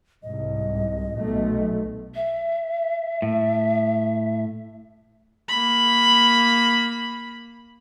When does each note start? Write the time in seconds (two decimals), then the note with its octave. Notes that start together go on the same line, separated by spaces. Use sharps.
0.23 C2 G#2 D#5
1.17 B1 B2 A3
2.15 E5
3.22 A2
5.49 A#3 B5